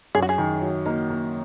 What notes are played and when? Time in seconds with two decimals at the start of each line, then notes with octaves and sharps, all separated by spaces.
0.15 F#2 G#4
0.22 F#4
0.29 G#4
0.38 D#3
0.62 F#3
0.86 A#3 D#4
1.10 A#3